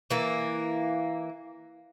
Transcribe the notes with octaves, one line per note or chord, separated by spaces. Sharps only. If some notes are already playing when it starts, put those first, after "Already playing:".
E3 A#3